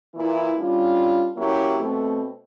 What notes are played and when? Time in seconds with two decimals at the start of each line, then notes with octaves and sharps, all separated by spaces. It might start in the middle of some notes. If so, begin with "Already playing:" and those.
0.15 A#2 E3 E4
0.58 G3 C#4 D4 F4
1.36 F#3 A#3 C#4 E4 G4
1.80 B2 A3 C4